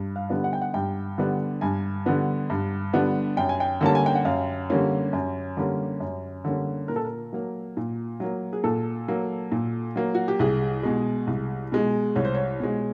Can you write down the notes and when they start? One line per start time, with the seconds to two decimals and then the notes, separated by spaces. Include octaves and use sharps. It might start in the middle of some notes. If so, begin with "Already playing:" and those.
Already playing: G2
0.16 F5
0.29 D3 G3 B3 D4
0.44 F#5
0.53 G5
0.61 F#5
0.74 G2 G5
1.18 D3 G3 B3 D4
1.61 G2 G#5
2.06 D3 G3 B3 D4
2.50 G2
2.93 D3 G3 B3 D4
3.37 F#2 G5
3.49 G#5
3.60 G5
3.81 D3 G3 A#3 C#4 A5
3.95 G#5
4.06 G5
4.15 F#5
4.25 F#2 F5
4.70 D3 G3 A#3 C#4
5.13 F#2
5.57 D3 G3 A#3 C#4
6.00 F#2
6.45 D3 G3 A#3 C#4
6.88 A#2 A#4
6.96 A4
7.04 A#4
7.33 F#3 A#3
7.77 A#2
8.20 F#3 A#3
8.53 G#4
8.64 A#2 A4
9.08 F#3 A#3
9.52 A#2
9.96 F#3 A#3
10.14 F#4
10.28 G4
10.39 C2 G#4
10.83 B2 G#3
11.27 C2
11.72 B2 G#3
12.16 C2 C#5
12.25 C5
12.35 C#5
12.60 B2 G#3